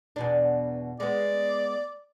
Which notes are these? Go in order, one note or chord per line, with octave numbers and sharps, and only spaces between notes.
E2 B2 D4
G#3 B3 D5